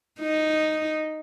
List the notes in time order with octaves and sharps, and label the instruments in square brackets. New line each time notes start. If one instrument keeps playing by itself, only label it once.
[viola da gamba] D#4